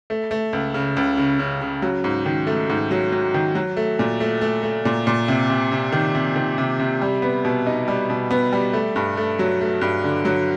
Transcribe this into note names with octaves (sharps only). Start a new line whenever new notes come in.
A3
A3
C#2
C#3
C#2
C#3
C#3
C#3
F#3
G#2
D#3
A3
G#2
F#3
F#3
D#3
F#3
A3
A#2
A3
A3
A3
A#2
A#2
C3
C3
C3
D#3
C3
D#3
C3
C3
G3
B3
B2
D#4
G3
B2
B3
G3
A3
G2
A3
F#3
A3
G2
D3
F#3